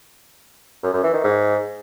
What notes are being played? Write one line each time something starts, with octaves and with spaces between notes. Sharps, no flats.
F#2
F#2
E3
D#3
G#2